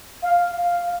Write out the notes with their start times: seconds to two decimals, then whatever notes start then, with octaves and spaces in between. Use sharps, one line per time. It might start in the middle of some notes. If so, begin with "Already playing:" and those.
0.22 F5
0.49 F5